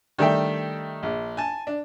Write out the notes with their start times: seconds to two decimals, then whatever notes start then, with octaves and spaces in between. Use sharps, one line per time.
0.19 D#3 G3 A3 D4 E5 G5
1.03 A#1
1.37 G#5 A5
1.67 D4